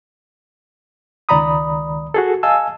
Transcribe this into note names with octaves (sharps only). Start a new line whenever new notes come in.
C#2 D#3 D5 A#5 B5 D#6
F#4 G#4 A4
D#5 F5 G#5 A5 E6